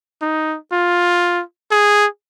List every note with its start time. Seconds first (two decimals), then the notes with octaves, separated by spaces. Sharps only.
0.22 D#4
0.73 F4
1.72 G#4